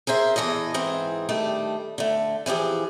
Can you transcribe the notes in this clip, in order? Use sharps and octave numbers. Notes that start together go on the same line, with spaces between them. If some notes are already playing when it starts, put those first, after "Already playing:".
G#4 A#4 C5 E5
E2 E3 A4 D#5
G#2 E3 C4 G#4
D#3 G3 A3 D4
D3 A3
E3 F3 G4 G#4